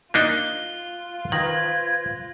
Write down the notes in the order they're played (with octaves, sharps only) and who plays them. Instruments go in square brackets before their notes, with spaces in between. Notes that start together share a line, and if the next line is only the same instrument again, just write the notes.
[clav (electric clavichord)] A#3 D4 D#4 [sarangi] F4 [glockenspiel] F#6 C7 G7
[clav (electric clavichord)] D#3 [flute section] B4 C5 G#6 [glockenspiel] A#6 F#7